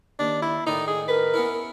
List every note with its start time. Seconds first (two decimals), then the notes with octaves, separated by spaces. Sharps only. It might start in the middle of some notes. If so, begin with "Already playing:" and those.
0.19 D#2 D4
0.42 E4
0.67 A2 D#3 D#4 D5
0.88 G#4
1.08 A#4 B4
1.34 B3 C#4 E4